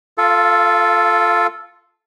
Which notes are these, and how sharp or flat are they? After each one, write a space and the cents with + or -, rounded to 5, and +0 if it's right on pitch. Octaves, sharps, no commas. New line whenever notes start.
F4 +0 A4 +0 F5 -35